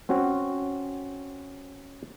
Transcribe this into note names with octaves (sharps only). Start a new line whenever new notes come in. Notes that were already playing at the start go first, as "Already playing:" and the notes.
C4 C#4 F#4